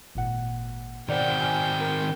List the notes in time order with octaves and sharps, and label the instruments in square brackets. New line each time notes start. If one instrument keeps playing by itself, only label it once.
[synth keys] G#1 A#2 F#5
[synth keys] B2 D5 F#5 [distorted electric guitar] D#3 C4 [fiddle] G5
[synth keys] G#5 F6
A#4